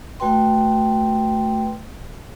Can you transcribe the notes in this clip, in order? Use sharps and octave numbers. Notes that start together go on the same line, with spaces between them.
A3 F#4 B4 G5 C6